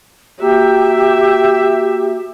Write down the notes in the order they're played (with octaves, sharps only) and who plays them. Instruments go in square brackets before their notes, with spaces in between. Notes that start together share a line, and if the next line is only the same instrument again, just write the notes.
[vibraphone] A#3 F#4 [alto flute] G4 [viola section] E5